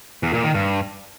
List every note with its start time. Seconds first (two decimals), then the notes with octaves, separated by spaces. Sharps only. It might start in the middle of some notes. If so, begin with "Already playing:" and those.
0.23 E2
0.34 A#2
0.44 D#3
0.54 G2